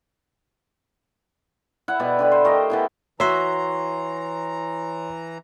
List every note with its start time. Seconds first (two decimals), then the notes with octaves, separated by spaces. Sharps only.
1.88 E4 F#5
2.00 B2 B3 D5 G5
2.19 D3 G4 B4
2.31 C5
2.45 A3 G4 A#4 D#5
2.70 E3 B3 E4
3.20 E3 F#4 C#5 E5 A#5 C6